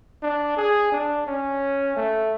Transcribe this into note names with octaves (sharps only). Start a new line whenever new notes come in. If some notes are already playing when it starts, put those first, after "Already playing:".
D4
G#4
D4
C#4
A3